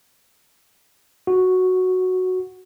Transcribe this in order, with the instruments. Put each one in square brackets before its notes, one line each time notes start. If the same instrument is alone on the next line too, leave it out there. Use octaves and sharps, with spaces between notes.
[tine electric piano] F#4